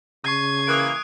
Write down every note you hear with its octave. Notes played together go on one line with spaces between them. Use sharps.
C#3 C#6 G#6 C7 D#7
E3 A#3 D#6 F#6 D7